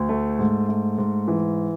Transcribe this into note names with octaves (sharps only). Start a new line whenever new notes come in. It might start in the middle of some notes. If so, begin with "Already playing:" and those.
Already playing: D2
A3
G#2
A3
G#2
E3